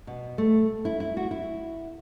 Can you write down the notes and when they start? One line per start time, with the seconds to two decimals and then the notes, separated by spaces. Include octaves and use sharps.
0.07 B2
0.38 A3
0.85 E4
1.00 E4
1.17 F#4
1.31 E4